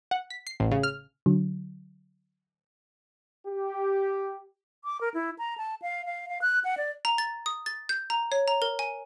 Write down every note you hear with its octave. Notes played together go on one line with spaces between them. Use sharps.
F#5
B6
C7
A1
C#3
F6
D3 F#3
G4
D6
A#4
E4
A#5
A5
F5
F5
F5
F#6
F#5
D5
A#5
A6
D#6
A6
G6
A#5
C#5
A#5
A#4
G#5